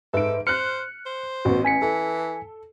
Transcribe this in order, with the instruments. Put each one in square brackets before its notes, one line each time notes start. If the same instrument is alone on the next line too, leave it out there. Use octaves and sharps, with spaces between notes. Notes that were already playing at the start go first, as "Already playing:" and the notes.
[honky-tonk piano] G#2 D7 [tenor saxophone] A4 [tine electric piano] B4 E5
[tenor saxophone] C5 [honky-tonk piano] F6 F#6 [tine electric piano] C#7
[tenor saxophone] C5
[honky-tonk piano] A1 B3 [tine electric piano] F#4
[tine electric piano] G#5 B6 C#7
[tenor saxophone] E3 [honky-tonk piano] A4